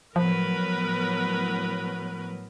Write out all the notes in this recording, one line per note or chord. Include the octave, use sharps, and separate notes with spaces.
A2 F3 F#3 B3 A#4 B4